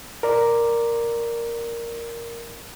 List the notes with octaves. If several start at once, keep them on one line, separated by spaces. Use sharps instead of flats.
A#4 D5